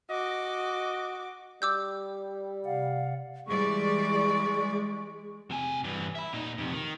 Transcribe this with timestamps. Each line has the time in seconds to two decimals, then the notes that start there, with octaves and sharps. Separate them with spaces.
0.10 F#4 D#5 D6
1.62 G3 D6 E6 G6
2.65 C3 D5 F5 F#5
3.47 E3 G3 G#3 D5 C#6
5.51 C3 G#5
5.84 G2 E3
6.15 E5 B5
6.33 A#2 D#4
6.58 F2 C3
6.73 D#3